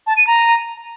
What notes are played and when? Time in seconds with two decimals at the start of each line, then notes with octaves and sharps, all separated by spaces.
0.07 A5
0.17 D#7
0.27 A#5